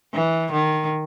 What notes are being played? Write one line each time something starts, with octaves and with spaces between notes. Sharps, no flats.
E3
D#3